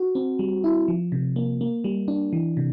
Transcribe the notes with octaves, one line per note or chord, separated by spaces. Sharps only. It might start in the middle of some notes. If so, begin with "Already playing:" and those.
Already playing: F#4
C4
G3
E4
F3
C3
A#3
A#3
G3
D4
E3
C3